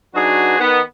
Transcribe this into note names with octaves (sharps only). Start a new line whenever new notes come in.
F#3 D4 D#4 F#4 G#4 B4
D#3 B3